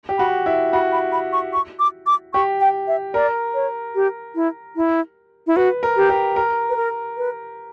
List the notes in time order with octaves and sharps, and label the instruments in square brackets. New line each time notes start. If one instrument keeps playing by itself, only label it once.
[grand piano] G4
[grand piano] F#4 [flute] B5
[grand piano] E4
[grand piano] F#4 [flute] B5
[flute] B5
B5
C#6
C#6
D6
D6
[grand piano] G4 [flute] C#6
[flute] G5
E5
[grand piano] A#4 [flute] D5
[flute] C#5
G4
E4
E4
E4
[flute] F#4 [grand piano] B4
[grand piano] A#4
[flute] G4
[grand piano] G4
A#4
[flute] B4
A#4
B4